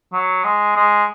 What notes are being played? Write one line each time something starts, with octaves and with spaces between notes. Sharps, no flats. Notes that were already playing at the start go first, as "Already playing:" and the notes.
F#3
G#3
G#3